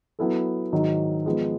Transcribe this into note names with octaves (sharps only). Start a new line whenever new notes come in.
F#3 B3 E4 A4
G#2 D#3 F#3
F3 G#3 B3